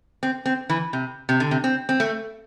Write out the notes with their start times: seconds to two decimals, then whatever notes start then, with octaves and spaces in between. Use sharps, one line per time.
0.23 C4
0.46 C4
0.70 E3
0.93 C3
1.29 C3
1.40 D3
1.51 C3
1.64 C4
1.89 C4
2.00 A3